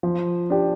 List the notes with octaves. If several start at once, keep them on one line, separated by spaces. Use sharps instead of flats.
F3
D4 G4